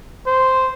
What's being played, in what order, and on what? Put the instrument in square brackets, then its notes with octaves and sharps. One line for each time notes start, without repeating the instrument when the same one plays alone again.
[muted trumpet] C5